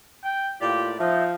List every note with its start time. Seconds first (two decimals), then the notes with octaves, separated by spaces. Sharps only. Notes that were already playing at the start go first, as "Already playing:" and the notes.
0.24 G5
0.61 A2 A#3 F4 G4 D5
0.99 F3 D#4 E5